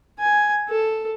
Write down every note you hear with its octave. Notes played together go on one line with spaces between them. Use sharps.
G#5
A4